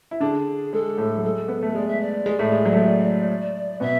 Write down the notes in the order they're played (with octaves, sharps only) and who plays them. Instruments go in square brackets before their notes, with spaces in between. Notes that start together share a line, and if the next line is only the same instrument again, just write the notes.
[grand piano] E4
[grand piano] D3 D4 [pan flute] G#4
[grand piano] G#3 [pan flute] A4
[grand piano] A2 A3
F#3
[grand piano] G#3 [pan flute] A4
[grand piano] B3
A3
[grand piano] G#3 [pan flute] D5
[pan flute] E5
D5
[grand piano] G#3
A2 A3
G#3
F#3
A3
G#3
[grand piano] B2 B3 [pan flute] E5